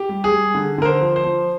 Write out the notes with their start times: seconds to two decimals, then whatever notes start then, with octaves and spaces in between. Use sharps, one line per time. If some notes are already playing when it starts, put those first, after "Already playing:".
Already playing: G4
0.09 G3
0.24 G#4
0.32 G3
0.55 D3
0.78 D3 A#4
0.85 C5
1.01 F3
1.16 C5
1.24 F3